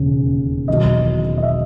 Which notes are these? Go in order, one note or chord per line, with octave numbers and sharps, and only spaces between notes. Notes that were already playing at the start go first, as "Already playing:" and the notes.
Already playing: E1 D#2 C#3
E1 E2 D#3 F#3 D#5
D#5
E5